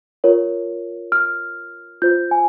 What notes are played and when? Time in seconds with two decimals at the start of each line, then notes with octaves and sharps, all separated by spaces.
0.24 F4 A#4 C#5
1.12 F6
2.02 F4 C5 G6
2.31 G#5